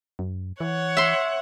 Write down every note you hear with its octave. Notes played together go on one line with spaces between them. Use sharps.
F#2
E3 C#5 F#5
E5 C6